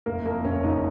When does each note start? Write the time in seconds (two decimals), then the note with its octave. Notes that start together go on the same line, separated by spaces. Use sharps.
0.06 F#1 A#3 A#4
0.25 F2 A#3 A#4
0.45 F#1 C#4 C#5
0.63 F#1 D#4 D#5